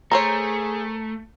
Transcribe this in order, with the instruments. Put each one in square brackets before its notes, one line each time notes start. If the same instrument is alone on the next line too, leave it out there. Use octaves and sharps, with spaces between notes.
[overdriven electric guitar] A3 [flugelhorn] G#4 [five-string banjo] A#4 C5 C#5 [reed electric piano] A#5